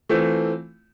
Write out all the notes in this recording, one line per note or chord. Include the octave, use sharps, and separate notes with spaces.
E3 A3 C4 F4